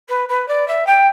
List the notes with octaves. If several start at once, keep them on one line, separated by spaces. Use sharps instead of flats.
B4
B4
D5
E5
G5